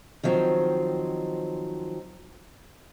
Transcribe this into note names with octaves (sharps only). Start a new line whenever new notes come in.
D#3 F3 F#3 C4